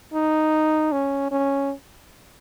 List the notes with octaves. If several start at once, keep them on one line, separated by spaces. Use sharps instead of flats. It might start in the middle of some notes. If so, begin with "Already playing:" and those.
D#4
C#4
C#4